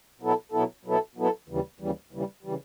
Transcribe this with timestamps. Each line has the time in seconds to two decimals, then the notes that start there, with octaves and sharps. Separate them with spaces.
0.21 B2 F#3 B3 E4 A4
0.52 B2 F#3 B3 E4 A4
0.85 B2 F#3 B3 E4 A4
1.15 B2 F#3 B3 E4 A4
1.48 D#2 C#3 E3 G3
1.80 D#2 C#3 E3 G3
2.12 D#2 C#3 E3 G3
2.43 C#3 E3 G3